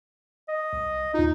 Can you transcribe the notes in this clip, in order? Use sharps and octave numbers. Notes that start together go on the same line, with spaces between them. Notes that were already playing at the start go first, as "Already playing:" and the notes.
D#5
C2
D#2 D#4 F4